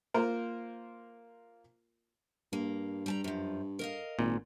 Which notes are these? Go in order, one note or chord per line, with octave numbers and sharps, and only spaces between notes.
A#3 F4 A#4 C5
G2 A#3
G3 A5 A#5
F#2 F3
A#4 D#5 F5
G#1 A#2